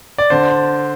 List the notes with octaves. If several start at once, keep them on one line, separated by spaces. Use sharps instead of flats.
D5
D3 C5